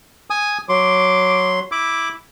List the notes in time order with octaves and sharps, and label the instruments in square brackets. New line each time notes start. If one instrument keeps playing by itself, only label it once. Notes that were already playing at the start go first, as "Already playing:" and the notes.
[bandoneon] G#5 D#6
[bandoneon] F#3 C6 [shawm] D6
[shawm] E4 [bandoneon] D6